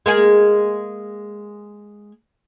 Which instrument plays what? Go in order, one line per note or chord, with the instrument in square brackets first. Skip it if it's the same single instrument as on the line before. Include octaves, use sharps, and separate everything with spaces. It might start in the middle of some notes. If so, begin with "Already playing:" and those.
[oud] G#3 A#3 G#4